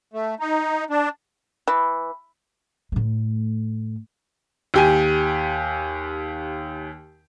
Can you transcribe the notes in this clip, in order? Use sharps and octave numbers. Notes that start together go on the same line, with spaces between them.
A3
D#4
D4
E3
A2 A3
D#2 G4 G#5